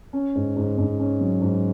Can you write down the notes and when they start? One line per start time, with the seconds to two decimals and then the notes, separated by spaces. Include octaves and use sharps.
0.13 C#4
0.35 G#2
0.57 G#2
0.78 G#2
0.99 C#4
1.21 F#3
1.42 G#2